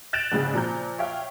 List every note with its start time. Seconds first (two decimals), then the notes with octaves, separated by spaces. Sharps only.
0.13 F#6 G6 A6 D7 E7 F7
0.32 A#1 G#2 C#3 G#3
0.53 A#2 F3 A#5 G6
0.99 C#5 E5 F5 G5